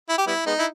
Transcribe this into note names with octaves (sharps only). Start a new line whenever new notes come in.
E4
G4
G3 B3 E4
G#3 B3 D#4
E4